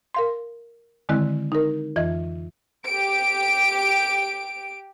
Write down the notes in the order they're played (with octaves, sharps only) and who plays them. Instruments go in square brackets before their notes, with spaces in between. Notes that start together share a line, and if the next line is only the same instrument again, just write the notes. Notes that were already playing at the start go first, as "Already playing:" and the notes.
[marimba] A#4 F5 C6
D3 D#3 G#3 C4 E4 F#6
D#4 A#4
F2 E3 F4 D#5 G#6
[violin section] G4 D7